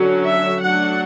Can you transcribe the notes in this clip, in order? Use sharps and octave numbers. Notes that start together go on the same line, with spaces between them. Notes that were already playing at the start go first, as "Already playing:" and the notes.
Already playing: D3 F#3 C#4
E5
F#3 A3 D4 F#5